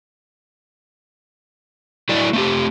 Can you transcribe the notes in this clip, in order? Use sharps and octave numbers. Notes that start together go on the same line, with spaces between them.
F#3 A3 E4 D5
A3 C4 G4